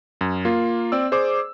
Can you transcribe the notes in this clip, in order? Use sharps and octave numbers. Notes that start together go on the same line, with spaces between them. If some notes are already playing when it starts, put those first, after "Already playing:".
F#2
A#3 F4
C4 D5 E6
G#4 C5 D5 D6